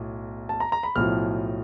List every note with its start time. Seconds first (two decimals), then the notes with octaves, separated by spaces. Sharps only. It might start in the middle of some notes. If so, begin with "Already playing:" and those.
Already playing: B1 A2
0.49 A5
0.60 A#5
0.72 A#5
0.83 B5
0.95 B1 A2 F3 F6